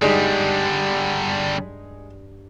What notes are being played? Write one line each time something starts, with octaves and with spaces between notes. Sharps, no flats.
G2 D3 G3 G#3 D#4 G#4